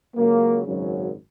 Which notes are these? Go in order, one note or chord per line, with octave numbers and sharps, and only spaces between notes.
C#2 C#3 F#3 A#3
G#1 F#2 C#3 F#3